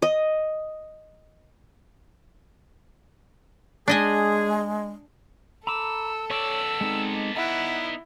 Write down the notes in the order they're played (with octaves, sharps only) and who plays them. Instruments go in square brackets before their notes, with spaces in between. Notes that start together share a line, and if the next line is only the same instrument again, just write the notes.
[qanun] D#5
[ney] G#3 [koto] D4 D#5 G#5 [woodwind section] G#4
[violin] A4 [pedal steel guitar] A#5 B5 D6 [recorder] E6
[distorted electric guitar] B3 D5 [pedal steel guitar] C#5 C#6 [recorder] E6
[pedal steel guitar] G#3 C4 D#4
[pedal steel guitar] D#4 F#6 [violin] E4 [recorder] F#5